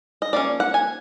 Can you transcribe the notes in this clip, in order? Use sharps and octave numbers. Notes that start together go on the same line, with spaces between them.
D#5
F3 A#3 C#4 D5
F#5
G#5